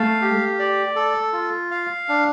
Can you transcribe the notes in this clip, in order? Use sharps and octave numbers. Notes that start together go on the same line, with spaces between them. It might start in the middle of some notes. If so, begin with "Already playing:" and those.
Already playing: A3 F5
G4
D5
A4
F4
F5
D4